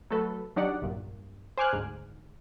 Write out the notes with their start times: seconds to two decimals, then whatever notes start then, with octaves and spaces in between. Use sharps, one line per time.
0.10 F#3 A3 A4 B4
0.56 F#3 D4 D#4 G4 D5 F#5
0.82 B1 G2 A#2
1.58 C5 G#5 D6 F6 F#6
1.73 D2 G#2